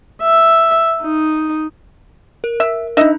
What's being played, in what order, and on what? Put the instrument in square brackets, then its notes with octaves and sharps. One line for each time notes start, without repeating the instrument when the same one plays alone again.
[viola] E5
D#4
[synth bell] A#4
[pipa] E5
[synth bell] D4 D#4 [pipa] D#5 E5